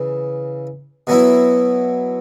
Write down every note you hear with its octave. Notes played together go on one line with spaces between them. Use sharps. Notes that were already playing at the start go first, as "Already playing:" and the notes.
Already playing: C#3 E3
B2 F#3 B3 E4